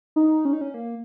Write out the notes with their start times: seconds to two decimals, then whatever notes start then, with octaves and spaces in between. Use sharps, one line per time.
0.16 D#4
0.45 C#4
0.53 D#4
0.61 C#4
0.74 A#3